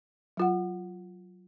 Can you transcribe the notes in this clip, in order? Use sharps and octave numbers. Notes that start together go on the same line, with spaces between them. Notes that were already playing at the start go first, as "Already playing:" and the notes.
F#3 F4 F#5